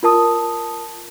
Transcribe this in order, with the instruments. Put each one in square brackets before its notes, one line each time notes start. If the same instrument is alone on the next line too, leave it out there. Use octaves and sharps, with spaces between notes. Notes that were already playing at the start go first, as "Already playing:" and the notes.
[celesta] F4 A#4 A5 D#6